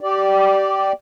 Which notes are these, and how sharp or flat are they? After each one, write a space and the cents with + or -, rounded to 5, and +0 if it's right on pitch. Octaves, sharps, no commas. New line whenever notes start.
G4 -20 D5 +0